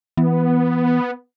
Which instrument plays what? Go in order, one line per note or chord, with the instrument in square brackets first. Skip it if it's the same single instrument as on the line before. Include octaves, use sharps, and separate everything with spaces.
[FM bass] E3 [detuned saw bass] B3